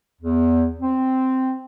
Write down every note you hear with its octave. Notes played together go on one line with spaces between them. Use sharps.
E2
C4